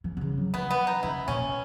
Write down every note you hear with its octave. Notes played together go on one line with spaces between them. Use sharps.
E3
B2
C#3
F#3
E3 B3
B3
D#4
C#3 E4
A#2 C#4